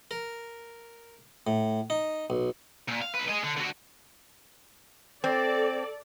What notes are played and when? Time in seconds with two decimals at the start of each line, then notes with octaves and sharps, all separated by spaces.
0.11 A#4
1.47 A2
1.90 D#4
2.30 B1
2.89 A#2
3.02 F5
3.15 B1 B4
3.29 G#4 D#5
3.44 D3
3.57 D3 F#4
5.24 C4 A4 D5